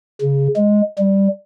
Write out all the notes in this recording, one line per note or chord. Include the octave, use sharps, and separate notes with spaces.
C#3
G#3
G3